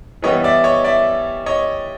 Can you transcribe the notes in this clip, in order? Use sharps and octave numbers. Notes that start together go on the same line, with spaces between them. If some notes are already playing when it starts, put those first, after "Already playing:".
E3 G3 B3 C#5 D#5
D5 E5
C#5 D#5
D5 E5
C#5 D#5